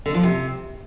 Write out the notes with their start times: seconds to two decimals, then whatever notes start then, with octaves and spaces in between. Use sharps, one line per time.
0.06 D3
0.14 F3
0.23 C3